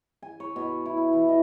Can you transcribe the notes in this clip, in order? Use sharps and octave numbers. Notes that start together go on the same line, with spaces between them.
G#5
C#5
B2
E4
E4
E3
D#5